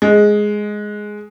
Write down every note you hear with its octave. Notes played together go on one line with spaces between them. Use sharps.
G#3